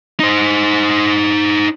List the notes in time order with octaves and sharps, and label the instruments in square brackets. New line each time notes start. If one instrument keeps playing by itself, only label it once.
[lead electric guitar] D#4 C5